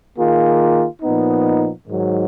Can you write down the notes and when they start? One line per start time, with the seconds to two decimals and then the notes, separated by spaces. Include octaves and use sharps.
0.18 D#3 A#3 F4 G#4
1.02 A#2 F3 B3 D#4
1.87 G#2 D#3 F#3